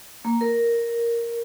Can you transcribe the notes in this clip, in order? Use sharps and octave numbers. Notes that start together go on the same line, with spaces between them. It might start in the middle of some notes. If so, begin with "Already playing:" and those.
A#3
A#4